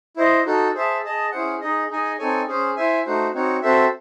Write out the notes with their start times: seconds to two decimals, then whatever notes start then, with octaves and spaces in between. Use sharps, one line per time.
0.17 E4 C5 D#5
0.45 D#4 F#4 A4
0.74 G#4 C5 E5 A5
1.03 G#4 D#5 A5
1.32 C#4 E4 G#4 C5 F#5
1.61 D#4 G#4 D#5
1.90 D#4 G#4 D#5 G#5
2.18 C4 D#4 A4 C#5 G#5
2.48 C#4 G#4 C5
2.76 E4 C5 E5 G#5
3.05 A3 D#4 F#4 C5
3.34 C4 D#4 F#4 C#5
3.62 C4 F#4 A4 C5 E5